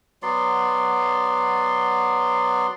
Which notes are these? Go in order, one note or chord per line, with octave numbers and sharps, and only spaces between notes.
F#3 B3 D5 C6